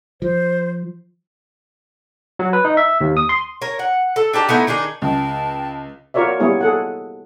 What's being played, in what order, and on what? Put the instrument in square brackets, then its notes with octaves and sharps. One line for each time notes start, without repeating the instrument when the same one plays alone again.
[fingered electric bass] F3 [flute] C5
[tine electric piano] F#3
B4
D#4
E5
D#2
D#6
C6
[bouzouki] A#4 C#5
F#5
A4
D4 G4 A5 A#5
A3 B3 D#4 E4
D#3 D4 D#4 G#4
[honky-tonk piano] C#2 [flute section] G5 A5
[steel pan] F4 F#4 A#4 C#5 D5 E5
G3 A#3 B3 E4 G#4 C#5
G#4 A4 F#5